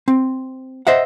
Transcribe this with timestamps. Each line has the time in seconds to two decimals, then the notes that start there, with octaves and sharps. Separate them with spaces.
0.08 C4
0.87 C5 D#5 E5 F#5